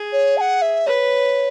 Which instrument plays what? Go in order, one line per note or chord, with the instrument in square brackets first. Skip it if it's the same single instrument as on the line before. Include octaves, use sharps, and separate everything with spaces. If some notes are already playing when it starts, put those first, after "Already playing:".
Already playing: [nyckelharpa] G#4
[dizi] C#5
A5
F#5
E5
[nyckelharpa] B4 [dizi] C#5